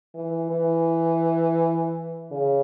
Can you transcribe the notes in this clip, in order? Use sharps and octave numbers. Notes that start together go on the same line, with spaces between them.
E3
E3
C#3